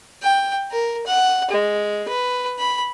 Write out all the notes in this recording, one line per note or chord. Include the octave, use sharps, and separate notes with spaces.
G5
A#4
F#5
G#3
B4
B5